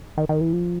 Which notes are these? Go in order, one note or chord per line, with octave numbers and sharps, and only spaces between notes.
D#3
D#3
E3
F3